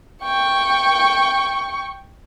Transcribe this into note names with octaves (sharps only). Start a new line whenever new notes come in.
G5 C#6